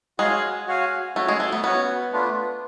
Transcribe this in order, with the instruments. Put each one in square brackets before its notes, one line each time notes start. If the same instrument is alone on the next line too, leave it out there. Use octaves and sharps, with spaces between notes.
[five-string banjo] G#3 [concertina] F#4 C#5 F5 G#5
[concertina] F#4 C#5 F5 G#5
[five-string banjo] A3 [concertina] C#4 F#4 C#5
[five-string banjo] G#3
A3
B3
[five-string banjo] B3 [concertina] C#4 F#4 C#5
[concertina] A3 D4 F4 B4